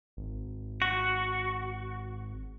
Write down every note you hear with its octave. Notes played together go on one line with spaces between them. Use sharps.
G#1
F#4